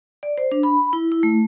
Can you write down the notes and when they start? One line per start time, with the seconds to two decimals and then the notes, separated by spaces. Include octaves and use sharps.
0.23 D5
0.38 C5
0.52 D4
0.63 B5
0.93 E4
1.12 E4
1.23 A3